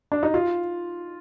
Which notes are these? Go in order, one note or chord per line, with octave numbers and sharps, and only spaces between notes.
D4
D#4
F4